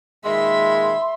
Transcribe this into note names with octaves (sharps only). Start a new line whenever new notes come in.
A#2 D#3 G#3 E5 B5 C6